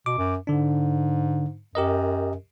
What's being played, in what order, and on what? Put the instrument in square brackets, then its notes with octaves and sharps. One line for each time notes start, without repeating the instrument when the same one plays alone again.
[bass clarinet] B2 [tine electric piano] D6
[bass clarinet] F#2
[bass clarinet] G#2 [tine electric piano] D3 D4
[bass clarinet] F#2 [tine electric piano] G4 A#4 D#5